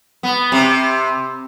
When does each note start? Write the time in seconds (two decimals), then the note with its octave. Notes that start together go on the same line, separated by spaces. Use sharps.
0.23 B3
0.52 C3